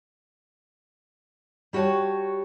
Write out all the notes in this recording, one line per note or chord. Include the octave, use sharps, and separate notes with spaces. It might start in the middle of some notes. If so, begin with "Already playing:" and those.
G3 F#4 G4 C#5 A5